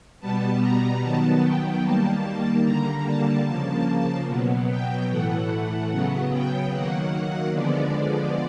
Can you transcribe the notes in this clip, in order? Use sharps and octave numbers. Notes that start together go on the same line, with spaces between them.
B2 G3 B3 A5
A#5
D#3 F#3 B3 A5
G5
D#3 G3 A#3 A5
D3 G3 A#3 A#5
A5
C#3 F3 A#3
B2 F#3 B3
G5
A2 E3 A3 F#5
C#3 F#3 B3
G5
D#3 F#3 A#3 F#5
D3 F3 G#3 B3 D5